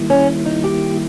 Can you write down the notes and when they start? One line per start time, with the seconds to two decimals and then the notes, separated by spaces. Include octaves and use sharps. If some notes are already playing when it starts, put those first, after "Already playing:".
Already playing: D#3 G3 A#3 E4
0.10 C#4
0.46 D#4
0.64 G4